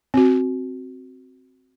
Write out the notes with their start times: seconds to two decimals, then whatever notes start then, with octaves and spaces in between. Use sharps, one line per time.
0.14 C4 F#4